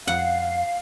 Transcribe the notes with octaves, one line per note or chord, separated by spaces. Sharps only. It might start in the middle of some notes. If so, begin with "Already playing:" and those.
F2 F5 F#5